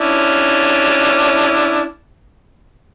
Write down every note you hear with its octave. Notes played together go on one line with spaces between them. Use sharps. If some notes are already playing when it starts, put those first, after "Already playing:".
C#4 D4 E4